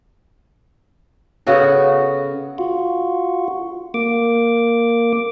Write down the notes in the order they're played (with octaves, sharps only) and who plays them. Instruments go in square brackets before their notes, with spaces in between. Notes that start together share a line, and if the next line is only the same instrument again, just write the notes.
[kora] C#3 B3 F#4 A4
[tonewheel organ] F4 F#4
A#3 D6